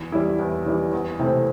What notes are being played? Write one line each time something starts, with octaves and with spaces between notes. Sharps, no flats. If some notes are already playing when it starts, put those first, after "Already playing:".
Already playing: E2
E3 G3 E4
E2
E3 G3 E4
E2
C3 A3 C4 E4